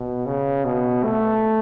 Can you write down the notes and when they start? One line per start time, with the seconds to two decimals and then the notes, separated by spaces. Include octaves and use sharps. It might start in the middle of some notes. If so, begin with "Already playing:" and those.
Already playing: B2
0.26 C#3
0.65 B2
1.04 A3